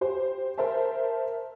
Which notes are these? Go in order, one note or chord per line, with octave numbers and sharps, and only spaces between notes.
G4 C5
A#4 C5 E5 A5